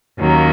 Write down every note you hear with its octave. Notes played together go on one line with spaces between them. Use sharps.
D#2 D#3 F#3 A#3 C#4